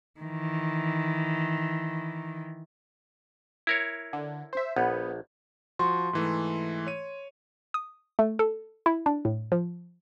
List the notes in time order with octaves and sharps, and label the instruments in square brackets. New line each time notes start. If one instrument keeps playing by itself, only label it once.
[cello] D#3 E3
[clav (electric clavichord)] E4 A#4 C#5
[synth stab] D3
C5 E5
[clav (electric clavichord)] A#1 [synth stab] B3
[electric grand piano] F3 F#4 C#6 [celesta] C6
[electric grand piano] G#2 E3 A3
C#5 D#7
[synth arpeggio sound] D#6
A3
A4
E4
D4
A2
F3